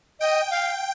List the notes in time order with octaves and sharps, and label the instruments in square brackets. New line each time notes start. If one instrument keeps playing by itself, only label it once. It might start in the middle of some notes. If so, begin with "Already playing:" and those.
[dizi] D#5 [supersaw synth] G5
[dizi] F5